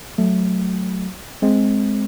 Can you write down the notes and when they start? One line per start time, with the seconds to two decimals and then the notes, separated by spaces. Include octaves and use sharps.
0.18 F#3 A3
1.42 G#3 C4